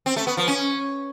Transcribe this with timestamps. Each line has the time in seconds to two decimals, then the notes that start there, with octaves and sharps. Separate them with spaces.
0.06 C4
0.16 A3
0.27 B3
0.37 F3
0.48 C#4